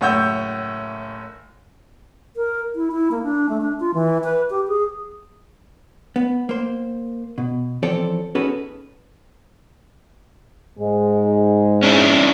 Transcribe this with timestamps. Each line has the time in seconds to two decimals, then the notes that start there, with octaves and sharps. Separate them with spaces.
0.01 F#1 A2 C#5 F#5 E6 G6
2.36 A#4
2.75 E4
2.92 E4
3.11 A#3
3.23 D4
3.49 A3
3.61 D4
3.80 F4
3.94 E3
4.24 B4
4.50 G4
4.68 G#4
6.16 B3
6.49 A#3 C5
7.38 B2
7.83 E3 F3 C4 A4 C#5 D5
8.35 C#4 D#4 F#4 G#4 A4 B4
10.77 G#2 G#3
11.83 C#4 D4 E4